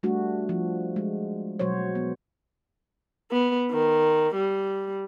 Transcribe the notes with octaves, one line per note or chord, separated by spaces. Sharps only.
G3 A3 D4 F#4
F3
G#3
B2 F#3 F#4 C5 C#5
B3
B3
D#3
G3